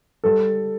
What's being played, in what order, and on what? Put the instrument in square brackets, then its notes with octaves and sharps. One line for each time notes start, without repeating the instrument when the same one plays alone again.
[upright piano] G3 A4